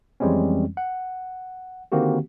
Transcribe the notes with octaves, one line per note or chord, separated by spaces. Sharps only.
F2 E3 G3 G#3 C4 C#4
F#5
D3 D#3 A#3 C4 F#4 G4